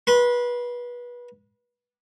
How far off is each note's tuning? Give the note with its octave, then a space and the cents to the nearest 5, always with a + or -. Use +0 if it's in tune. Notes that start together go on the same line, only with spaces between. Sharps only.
B4 -25 C6 +0